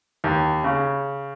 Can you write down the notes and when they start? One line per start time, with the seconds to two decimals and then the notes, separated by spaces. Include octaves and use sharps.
0.24 D#2
0.64 C#3